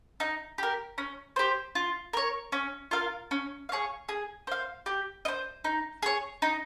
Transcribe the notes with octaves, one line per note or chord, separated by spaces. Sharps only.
D#4
G4 A#4
C#4
G4 C5
F4
A#4 C#5
C#4
F4 A#4 F5
C#4
G#4 C#5 F5
G#4
C5 F5
G4
D#5
C5
D#4
G#4 C#5
D#4